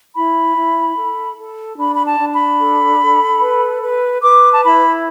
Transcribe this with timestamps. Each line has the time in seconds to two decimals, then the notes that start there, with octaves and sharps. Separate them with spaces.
0.15 E4 B5
0.56 E4
0.96 A4
1.37 A4
1.78 D4 B5
1.94 B5
2.05 A5
2.19 D4
2.32 B5
2.60 A4
3.00 A4
3.41 B4
3.82 B4
4.22 B4 D6
4.53 A5
4.63 E4 B5